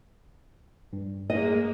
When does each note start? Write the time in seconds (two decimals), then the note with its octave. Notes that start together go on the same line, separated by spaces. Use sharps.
0.93 G2
1.30 G#3 A#3 D#5